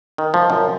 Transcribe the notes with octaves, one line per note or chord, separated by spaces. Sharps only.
D#3
F3
F#2